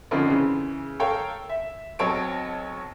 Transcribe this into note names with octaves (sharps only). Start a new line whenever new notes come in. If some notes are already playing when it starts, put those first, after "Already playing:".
D3 F3 A#3 C4 C#4 D#4
C#3 E3
A4 A#4 C#5 F5 G5
E5
B1 F#3 C4 C#5 A5 D7